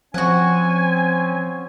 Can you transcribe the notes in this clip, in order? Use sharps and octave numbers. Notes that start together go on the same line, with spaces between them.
F3 C4 C#4 F#4 F#5 G#5